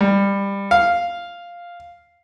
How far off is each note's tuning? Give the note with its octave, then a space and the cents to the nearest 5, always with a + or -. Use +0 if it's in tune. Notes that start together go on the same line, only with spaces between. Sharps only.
G3 +20
F5 +0